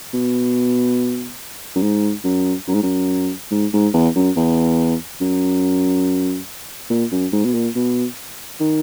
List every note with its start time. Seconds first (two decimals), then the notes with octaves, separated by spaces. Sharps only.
0.14 B2
1.75 F#2
1.82 G#2
2.24 F#2
2.68 F#2
2.74 G#2
2.83 F#2
3.51 G#2
3.73 G#2
3.94 E2
4.15 F#2
4.36 E2
5.21 F#2
6.90 A#2
7.12 F#2
7.33 G#2
7.45 B2
7.54 A#2
7.76 B2
8.60 D#3